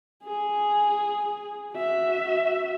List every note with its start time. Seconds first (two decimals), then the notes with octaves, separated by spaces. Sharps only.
0.24 G#4
1.74 F#4 E5